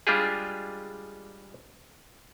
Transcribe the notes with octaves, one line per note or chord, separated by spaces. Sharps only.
G3 G#3 D4 F4 G4 G#4